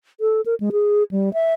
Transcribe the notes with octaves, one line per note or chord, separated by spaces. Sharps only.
A4
A#4
G#3
G#4
G3
E5